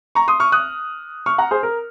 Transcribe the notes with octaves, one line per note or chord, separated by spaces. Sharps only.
A#5 C#6
C6 D#6
C#6 F6
D#6 F#6
C#6 F6
F#5 A#5
G#4 C5
A#4